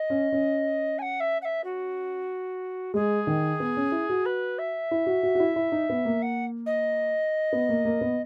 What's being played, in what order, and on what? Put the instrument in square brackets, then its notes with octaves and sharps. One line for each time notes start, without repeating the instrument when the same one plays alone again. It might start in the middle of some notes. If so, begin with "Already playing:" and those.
Already playing: [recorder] D#5
[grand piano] C#4
C#4
[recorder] G#5
F#5
E5
F#5
E5
F#4
[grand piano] G#3 [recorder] G#4
[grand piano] D#3
B3
C#4
E4
F#4
[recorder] B4
E5
[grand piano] E4
F#4
F#4
F#4
E4
E4
D#4
B3
A#3
[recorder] F#5
D#5
[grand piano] B3
A#3
A#3
B3